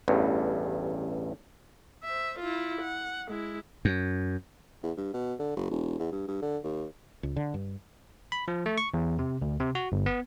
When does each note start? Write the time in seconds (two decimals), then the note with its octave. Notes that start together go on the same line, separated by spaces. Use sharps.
0.08 A1 E2 G2
2.04 C5 E5
2.39 E4 F4
2.82 F#5
3.29 G#3 E4
3.85 F#2
4.83 E2
4.97 G2
5.14 B2
5.39 D3
5.57 F#1
5.71 E1
6.00 E2
6.12 G2
6.28 G2
6.42 D3
6.64 D#2
7.23 C#2
7.36 D3
7.54 G2
8.32 B5
8.48 F3
8.66 A3
8.78 C#6
8.94 E2
9.19 C3
9.42 D2
9.60 C3
9.75 F#4
9.92 G1
10.06 B3